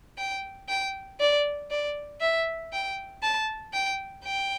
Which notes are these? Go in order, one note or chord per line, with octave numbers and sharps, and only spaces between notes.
G5
G5
D5
D5
E5
G5
A5
G5
G5